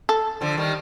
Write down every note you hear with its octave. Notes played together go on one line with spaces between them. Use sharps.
A4
D3 F3
D#3 G3